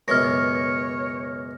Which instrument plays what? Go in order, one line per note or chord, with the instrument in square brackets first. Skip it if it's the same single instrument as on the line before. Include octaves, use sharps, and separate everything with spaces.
[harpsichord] C#2 F#2 B2 [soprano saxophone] C#5 [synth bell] F6 A#6